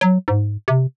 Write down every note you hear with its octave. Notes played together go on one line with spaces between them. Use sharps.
F#3
G#2
C3